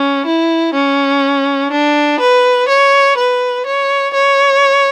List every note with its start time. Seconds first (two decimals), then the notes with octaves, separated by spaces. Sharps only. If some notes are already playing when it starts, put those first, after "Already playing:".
Already playing: C#4
0.26 E4
0.74 C#4
1.72 D4
2.20 B4
2.68 C#5
3.17 B4
3.66 C#5
4.14 C#5